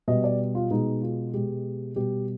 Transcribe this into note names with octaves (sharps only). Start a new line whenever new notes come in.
B2 G3 D#5
D5
F4
B2 G#3 D#4
F4
B2 G#3 G4
B2 G3 G4